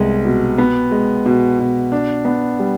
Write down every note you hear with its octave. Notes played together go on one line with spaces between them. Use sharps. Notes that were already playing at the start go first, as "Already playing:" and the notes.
Already playing: C2 G#3 B3
B2
B3
G#3
B2
B2
D4
B3
G3